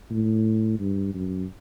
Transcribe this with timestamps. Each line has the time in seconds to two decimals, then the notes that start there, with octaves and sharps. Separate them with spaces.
0.10 A2
0.79 G2
1.14 F#2